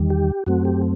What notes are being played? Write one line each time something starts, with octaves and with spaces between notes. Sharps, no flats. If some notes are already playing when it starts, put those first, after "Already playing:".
Already playing: E2 D#3 G3
G4
F#2 F#3 A3 C4 F#4
G4